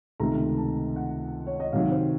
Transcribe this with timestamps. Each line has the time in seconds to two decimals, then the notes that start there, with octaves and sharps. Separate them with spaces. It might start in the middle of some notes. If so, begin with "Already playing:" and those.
0.20 C#2 C3 D#3 A3 A#5
0.58 A5
0.96 F#5
1.47 C#5
1.60 D#5
1.73 C3 D#3 F#3 F5
1.92 C5